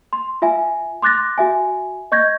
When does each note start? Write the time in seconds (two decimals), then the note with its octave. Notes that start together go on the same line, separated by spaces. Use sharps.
0.13 C6
0.42 F4 E5 G#5
1.02 C6 D6 F#6 A6 A#6
1.38 F#4 E5 G#5
2.12 D#5 C#6 G6 G#6 A#6